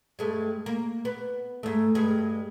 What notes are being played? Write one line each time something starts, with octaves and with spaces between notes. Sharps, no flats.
G2 G#3 A3
A#3
B3
G#2 A3
G2 G#3